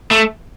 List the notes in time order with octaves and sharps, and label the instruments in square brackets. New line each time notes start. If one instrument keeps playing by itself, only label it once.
[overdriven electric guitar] A3